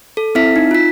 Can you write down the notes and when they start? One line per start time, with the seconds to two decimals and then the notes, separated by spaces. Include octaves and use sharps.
0.17 A4
0.35 C4 E4 E5 B6
0.56 D#4
0.71 F4 B6